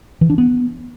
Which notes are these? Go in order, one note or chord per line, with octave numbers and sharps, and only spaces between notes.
E3
D4
B3